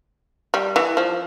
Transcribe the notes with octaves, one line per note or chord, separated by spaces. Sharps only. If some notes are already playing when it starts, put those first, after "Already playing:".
G3
E3
F3